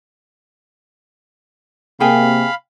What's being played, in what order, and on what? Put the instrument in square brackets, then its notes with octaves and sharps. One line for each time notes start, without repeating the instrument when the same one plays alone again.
[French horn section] C3 A#3 [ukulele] G#4 G5 G#5 [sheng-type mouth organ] F5 B5